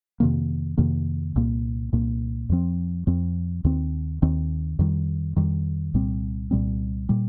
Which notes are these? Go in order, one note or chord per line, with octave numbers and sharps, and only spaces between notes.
F2 C3 D#3 A#3
F2 C3 D#3 A#3
C2 A#2 A#3
C2 A#2 A#3
F2 F3 C4
F2 F3 C4
D#2 D#3 C4
D#2 D#3 C4
F2 D#3 G3
F2 D#3 G3
C2 A#2 G3 C4
C2 A#2 G3 C4
A#2 G3